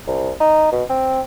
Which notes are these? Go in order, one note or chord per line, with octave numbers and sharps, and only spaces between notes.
C2
D#4
B2
C4